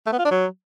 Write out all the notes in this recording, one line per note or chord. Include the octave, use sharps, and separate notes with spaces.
A3
B3
F4
D4
F#3